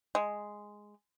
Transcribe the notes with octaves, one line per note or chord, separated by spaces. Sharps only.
G#3